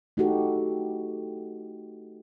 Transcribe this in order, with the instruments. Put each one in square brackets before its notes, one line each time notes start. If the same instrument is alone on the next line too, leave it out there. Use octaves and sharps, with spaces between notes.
[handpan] A3 D#4 E4 F#4 G4 A4